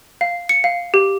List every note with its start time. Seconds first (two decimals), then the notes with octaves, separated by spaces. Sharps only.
0.21 F5
0.49 C#7
0.64 F5
0.94 G4